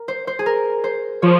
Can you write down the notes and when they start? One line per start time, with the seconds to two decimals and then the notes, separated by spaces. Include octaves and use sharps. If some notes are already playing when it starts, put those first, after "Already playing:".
Already playing: A#4
0.08 C5
0.27 C5
0.39 G#4
0.46 A#4
0.84 C5
1.22 F3 C#5